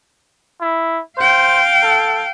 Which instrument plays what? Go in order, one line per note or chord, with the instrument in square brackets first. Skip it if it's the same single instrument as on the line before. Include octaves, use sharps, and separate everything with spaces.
[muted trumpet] E4
[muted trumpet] C5 [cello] F5 G5
[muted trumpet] A4